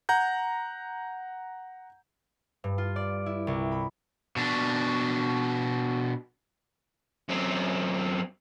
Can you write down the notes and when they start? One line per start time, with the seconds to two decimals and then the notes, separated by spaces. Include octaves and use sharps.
0.09 F#5 A#5 G6
2.64 G2
2.78 F4
2.96 D5
3.26 E4
3.47 C2
3.72 B5
4.36 B2 D4
7.29 F#2 C4